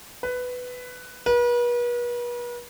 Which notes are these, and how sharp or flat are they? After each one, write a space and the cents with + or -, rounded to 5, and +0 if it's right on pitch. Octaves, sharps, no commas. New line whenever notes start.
B4 +10
B4 -40